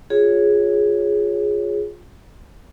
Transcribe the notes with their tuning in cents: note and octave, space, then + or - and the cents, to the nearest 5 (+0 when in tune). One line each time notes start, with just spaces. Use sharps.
F4 +20 G#4 +0 C#5 +0